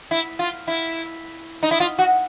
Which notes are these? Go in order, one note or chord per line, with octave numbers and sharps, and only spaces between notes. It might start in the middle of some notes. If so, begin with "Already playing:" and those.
E4
F4
E4
D#4
E4
F4
F#4